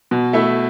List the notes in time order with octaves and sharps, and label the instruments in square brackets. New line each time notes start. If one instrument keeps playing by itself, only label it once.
[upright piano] B2
A3 E4